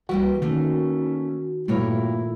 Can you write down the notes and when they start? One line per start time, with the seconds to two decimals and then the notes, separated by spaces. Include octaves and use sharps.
0.09 C2 E3 G3 A#3 F#4
0.42 D#3 A3 A#3 C#4
1.68 G2 A#2 A3 A#3 E4 C#5